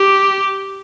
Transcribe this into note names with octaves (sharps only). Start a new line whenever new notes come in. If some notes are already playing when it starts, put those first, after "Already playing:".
Already playing: G4